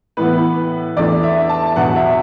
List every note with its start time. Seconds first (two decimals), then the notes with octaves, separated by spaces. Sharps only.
0.17 A2 E3 B3 B4
0.97 E2 E3 A3 D4 D5
1.23 E5
1.49 A5
1.76 E2 B2 F#3 D4 F#5
1.96 E5